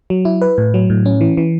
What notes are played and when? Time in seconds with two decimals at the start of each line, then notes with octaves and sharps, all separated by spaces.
0.10 F#3
0.25 E4
0.42 B4
0.58 A2
0.74 F#3
0.90 A2
1.06 C#4
1.21 E3
1.37 E3